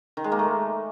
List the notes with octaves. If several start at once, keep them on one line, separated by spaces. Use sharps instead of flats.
D#3
G#3
A#3
A3